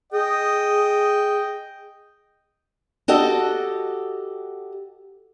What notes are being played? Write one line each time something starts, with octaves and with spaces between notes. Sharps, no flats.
G#4 D#5 G5
F#4 G4 A4 D#5 F#5